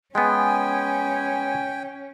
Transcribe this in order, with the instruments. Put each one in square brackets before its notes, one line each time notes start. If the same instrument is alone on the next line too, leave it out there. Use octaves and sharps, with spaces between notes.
[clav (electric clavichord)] G#3 B3 [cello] C#4 [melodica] G5 [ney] G#5